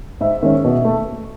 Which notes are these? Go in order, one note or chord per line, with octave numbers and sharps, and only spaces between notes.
G#2 E5
D#3 G#3 C#4
B2
A3